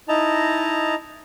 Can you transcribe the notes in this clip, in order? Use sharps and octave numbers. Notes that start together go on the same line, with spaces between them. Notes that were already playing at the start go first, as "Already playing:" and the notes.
D#4 E4 D#5 A5 A#5